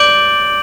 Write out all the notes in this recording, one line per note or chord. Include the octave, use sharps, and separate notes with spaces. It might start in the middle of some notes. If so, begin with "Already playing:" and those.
Already playing: D5 D6 G6 D7 F#7